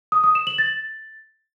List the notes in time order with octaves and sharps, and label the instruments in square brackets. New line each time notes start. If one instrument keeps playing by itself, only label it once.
[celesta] D#6
D#6
E7
F#7
A6